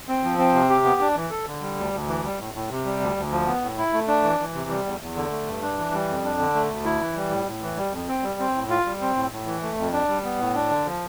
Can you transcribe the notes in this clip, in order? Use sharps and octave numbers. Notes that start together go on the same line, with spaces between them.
C4
F3
C4
C3
G4
B3
D4
E3
A4
D3
G3
D2
D2
E3
G3
A2
A2
C3
G3
D2
D2
F3
B3
A2
E4
A3
D4
E3
E3
C3
G3
E2
E2
D3
A3
G2
D4
E3
G3
F2
D4
D3
A3
D2
E4
E3
G3
A2
A2
E3
G3
F2
C4
G3
C4
A2
F4
G3
C4
A2
A2
E3
A3
F2
D4
G3
B3
A2
D4
D3
F3